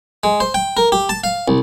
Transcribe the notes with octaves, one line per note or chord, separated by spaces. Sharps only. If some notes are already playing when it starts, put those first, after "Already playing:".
G#3
C5
G5
A#4
G4
A5
F5
C2